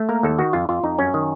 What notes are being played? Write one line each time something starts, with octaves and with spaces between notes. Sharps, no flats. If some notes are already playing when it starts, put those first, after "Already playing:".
Already playing: A3
A#3 A#4
D#2 A4
D#3 F#4
F2 F4
F2 F4
F2 D#4
F#2 C#4
D#3